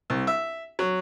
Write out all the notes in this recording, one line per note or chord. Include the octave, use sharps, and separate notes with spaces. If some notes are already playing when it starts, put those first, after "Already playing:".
C2
E5
F#3